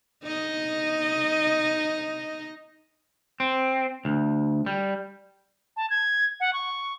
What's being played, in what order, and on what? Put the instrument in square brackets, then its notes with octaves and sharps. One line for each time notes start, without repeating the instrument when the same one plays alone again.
[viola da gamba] D#4 D#5
[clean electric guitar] C4
D2
G3
[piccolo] A5
G#6
F#5
C#6